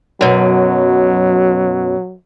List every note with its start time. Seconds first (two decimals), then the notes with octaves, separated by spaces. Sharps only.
0.21 F#2 B2 F#3